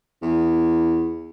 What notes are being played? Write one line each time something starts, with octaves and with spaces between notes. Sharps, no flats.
E2